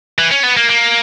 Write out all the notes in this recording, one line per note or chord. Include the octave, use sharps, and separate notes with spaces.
E3
C#4
B3
A#3
A#3